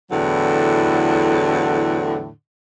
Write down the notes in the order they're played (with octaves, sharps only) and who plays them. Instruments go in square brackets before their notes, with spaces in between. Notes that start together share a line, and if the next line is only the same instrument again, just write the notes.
[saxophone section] E2 A2 D3 F#3